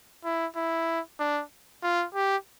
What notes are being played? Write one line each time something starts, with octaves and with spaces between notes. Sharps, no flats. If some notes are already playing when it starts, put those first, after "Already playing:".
E4
E4
D4
F4
G4